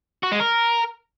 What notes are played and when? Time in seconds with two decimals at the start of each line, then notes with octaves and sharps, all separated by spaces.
0.23 F#4
0.31 G#3
0.40 A#4